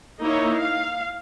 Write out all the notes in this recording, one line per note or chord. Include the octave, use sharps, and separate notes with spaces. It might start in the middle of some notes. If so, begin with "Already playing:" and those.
A#3 D#4 E4 C#5
F5